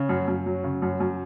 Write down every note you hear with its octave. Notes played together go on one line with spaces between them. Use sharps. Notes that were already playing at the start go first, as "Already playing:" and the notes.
Already playing: C#3
F#2
F#2
F#3
C#3
F#2
F#2